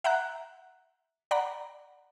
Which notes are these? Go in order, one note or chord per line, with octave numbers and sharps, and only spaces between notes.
E5 F#5 A#5 F#6
D5 F#5 A#5 B5